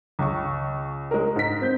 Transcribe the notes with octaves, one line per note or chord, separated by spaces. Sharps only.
C#2 C#6
G#3 A#4
G#2 B6
C4 G6